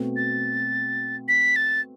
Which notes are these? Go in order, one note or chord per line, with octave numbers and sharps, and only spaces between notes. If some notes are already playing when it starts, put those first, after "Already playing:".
Already playing: B2 A3 C4 F#4 B4
A6
B6
A6